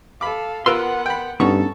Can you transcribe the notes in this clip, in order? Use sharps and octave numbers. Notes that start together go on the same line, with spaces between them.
A4 F5 B5 D6
B3 F4 A#4 B4 F#5 C6 E6
G5 B5
G2 B3 C#4 D#4 A4 C#6